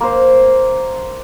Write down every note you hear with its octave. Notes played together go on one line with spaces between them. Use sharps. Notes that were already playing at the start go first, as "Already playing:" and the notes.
A#3 C5